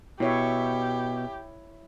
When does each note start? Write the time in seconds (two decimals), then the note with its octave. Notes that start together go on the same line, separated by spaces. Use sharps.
0.20 B2 E4 G4 C#5 E5